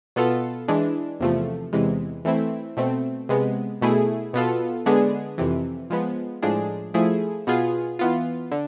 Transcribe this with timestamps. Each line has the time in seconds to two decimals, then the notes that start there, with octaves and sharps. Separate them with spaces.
0.16 B2 B3 F4 A4
0.68 E3 G#3 D4
1.20 E2 C3 F3 A3
1.73 E2 C3 E3 G#3
2.25 E3 A3 C4 E4
2.77 B2 A3 C4
3.29 C3 G#3 B3
3.81 B2 A3 E4 G#4
4.33 B2 B3 F4 A4
4.86 D3 G#3 B3 D4 G#4
5.38 F2 C3 E3
5.90 F3 G#3 B3
6.42 A2 F3 G#3 D4 G#4
6.94 F3 A3 E4 G#4
7.47 B2 B3 F4 G#4
7.99 E3 B3 F4
8.51 D3